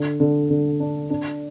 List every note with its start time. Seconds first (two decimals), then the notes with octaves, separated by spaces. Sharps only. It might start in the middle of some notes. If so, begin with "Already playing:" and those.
Already playing: D3
0.20 D3
0.50 D3
0.80 D4
1.10 D4